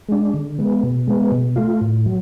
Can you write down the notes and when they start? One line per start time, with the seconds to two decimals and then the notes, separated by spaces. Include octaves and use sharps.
0.09 G#3 D4
0.34 D3
0.59 G#3 B3
0.83 B2
1.07 G#3 B3
1.32 B2
1.56 A3 F4
1.81 A2
2.06 F#3